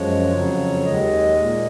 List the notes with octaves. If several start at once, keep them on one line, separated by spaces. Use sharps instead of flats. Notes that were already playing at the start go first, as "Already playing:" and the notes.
Already playing: F#2 F3 G#3 C#5
F2 C#3 F#3
D#2 D#3 G#3 D#5
A#2 G#3